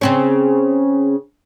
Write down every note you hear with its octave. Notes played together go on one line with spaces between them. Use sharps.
C#3 C4 C#4